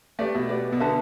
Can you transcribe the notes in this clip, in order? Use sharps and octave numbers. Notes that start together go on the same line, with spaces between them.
A3 G4 B4 D5
B2
G4 B4 D5
B2
D3 D4 B4 E5 A5